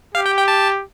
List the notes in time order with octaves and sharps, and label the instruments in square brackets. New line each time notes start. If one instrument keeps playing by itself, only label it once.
[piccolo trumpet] G4 [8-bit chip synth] F5
[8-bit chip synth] G5
G5
A5